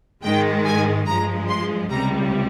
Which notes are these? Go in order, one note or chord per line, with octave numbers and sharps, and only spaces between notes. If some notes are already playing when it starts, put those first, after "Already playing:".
G#2 D#3 G#3 G5
G#5
G2 F3 G#3 A#5
C6
C#2 C3 G3 A#5